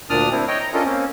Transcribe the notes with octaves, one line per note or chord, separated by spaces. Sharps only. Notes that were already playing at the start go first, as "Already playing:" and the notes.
D2 A#2 D4 D5 D#6 F6
C4 D4 E4
C#5 D#5 G5
A#5
C#4 D4 F4 A4 A#4 D#5
A#3 C4 C#4